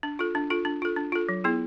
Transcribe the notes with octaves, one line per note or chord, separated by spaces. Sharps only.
D4
F4 A4
D4
F4 A4
D4
F4 A4
D4
F4 A4
F#3
B3 E4 G#4